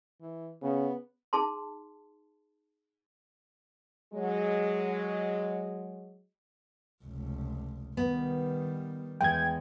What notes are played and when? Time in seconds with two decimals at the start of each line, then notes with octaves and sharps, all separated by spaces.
0.21 E3
0.62 C#3 B3
1.33 D#4 G#4 A5 C6
4.13 F#3 G#3
7.05 F1 C#2
7.97 D#3 G3 B3
9.21 E2 G#3 G5 G#6